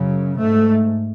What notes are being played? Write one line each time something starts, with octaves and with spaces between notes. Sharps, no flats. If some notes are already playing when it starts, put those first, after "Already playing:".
Already playing: F#2 C#3
G#2 A3